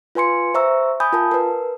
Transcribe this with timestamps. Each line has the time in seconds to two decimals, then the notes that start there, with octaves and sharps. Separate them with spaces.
0.15 F4 B4 G#5 C6 C#7
0.54 C5 E5 A#5 C#6 E6
1.00 G#5 B5 D#6 G6
1.13 F4 A#4 A5
1.31 A#4 B4